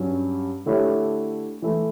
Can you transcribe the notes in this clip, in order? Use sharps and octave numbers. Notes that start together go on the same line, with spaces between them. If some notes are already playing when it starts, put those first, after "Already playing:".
Already playing: G2 F#3 C#4
D3 A3 E4 G4 C#5
E3 A3 E4